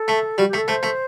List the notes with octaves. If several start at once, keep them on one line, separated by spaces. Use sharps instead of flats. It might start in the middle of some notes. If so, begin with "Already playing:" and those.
Already playing: A4
A3
G3 F#4
G4
A3
A4
A3 C5
A3